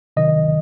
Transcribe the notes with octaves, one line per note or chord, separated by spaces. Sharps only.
C3 D#3 F#3 D#5